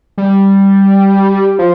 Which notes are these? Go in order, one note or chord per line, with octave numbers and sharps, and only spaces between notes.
G3
F3